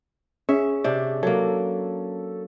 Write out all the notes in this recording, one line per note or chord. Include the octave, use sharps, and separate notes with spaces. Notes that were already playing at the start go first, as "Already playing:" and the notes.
C#4 G#4 E5
C3 D4
F#3 A#3 A4